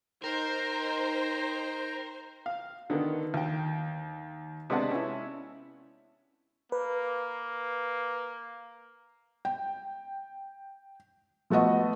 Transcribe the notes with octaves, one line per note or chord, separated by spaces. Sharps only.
D#4 A#4 C5 G5 A#5
F5
D3 D#3 B3
D#2 G5
C3 G#3 B3 D4 F#5 A5
C#4 E4
A#3 B4
G5
F3 A3 B3 F#4 D#5